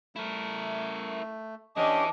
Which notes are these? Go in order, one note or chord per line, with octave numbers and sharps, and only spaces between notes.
A3 E4 A#4
E3 C#4 D4 G4 D#5 A5 D6